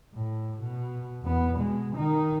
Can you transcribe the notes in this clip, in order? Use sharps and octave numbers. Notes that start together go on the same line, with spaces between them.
A2
B2
E2 B3
B2 G#3
D#3 D#4